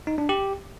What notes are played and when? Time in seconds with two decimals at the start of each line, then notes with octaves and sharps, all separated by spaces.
0.07 D#4
0.18 D4
0.29 G4